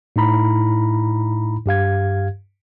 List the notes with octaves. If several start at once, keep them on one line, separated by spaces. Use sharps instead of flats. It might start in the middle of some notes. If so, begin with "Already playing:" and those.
A2 D#4 E4 A#5 B5
G2 G4 F5 G#6